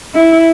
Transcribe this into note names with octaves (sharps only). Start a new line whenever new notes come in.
E4